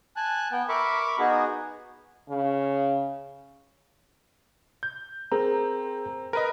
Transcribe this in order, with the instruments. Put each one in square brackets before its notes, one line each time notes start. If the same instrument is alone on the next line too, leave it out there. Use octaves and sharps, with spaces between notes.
[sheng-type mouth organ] G#5 A5 F#6
B3 G5
A#4 E5 B5 C#6 D6
B3 D#4 F#4 G#4
[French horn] C#3
[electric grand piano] G6
[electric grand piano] C4 [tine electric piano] G#4 A#4 A#5
[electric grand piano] A#4 B4 D#5